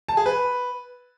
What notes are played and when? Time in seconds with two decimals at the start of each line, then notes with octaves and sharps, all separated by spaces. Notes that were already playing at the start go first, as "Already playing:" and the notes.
0.09 A5
0.17 G#4
0.26 B4